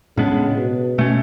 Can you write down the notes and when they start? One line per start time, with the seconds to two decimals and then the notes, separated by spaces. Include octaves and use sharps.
0.17 A2 C#3 G#3 B3 D4
0.57 B2
0.98 B2 A3 C#4